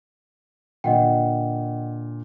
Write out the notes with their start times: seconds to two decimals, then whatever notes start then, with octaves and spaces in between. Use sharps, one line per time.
0.84 A#2 D3 D#5 F#5 G5